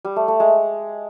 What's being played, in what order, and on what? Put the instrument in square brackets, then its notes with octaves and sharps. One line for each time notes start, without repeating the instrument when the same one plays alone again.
[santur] G3
A3
A3
G#3